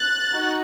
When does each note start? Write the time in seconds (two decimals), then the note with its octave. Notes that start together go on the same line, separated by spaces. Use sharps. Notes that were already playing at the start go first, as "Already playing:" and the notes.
Already playing: F#6 A6
0.32 D#4 F#4